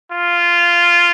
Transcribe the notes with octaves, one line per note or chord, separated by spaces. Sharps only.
F4